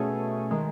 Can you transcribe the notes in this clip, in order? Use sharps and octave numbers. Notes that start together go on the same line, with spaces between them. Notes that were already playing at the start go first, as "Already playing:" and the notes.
Already playing: B2 A3 C#4 G#4
D#3 G#3